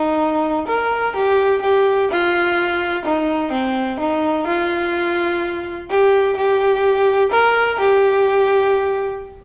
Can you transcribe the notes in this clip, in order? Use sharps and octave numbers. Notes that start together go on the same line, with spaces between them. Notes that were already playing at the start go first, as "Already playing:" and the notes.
Already playing: D#4
A#4
G4
G4
F4
D#4
C4
D#4
F4
G4
G4
A#4
G4